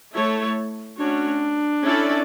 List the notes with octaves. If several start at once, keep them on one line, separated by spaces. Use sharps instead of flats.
A3 E4 A4 C#5
A3 C#4 D4 F#4 C#5
C#4 E4 A4 D5